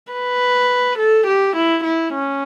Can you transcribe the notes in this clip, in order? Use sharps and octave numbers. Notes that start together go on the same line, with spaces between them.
B4
A4
G4
E4
E4
C#4